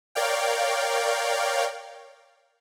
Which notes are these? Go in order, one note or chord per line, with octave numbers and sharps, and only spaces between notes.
A#4 C#5 D5 F5 G5